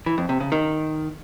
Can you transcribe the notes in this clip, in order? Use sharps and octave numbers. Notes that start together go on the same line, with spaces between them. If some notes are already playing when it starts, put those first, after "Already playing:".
E3
F2
C3
C#3
D#3